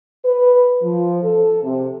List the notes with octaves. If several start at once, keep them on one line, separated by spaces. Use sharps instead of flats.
B4
F3
A4
C3